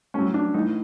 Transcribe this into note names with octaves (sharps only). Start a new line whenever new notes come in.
A2 F#3 C#4
D4
A2 E3 D#4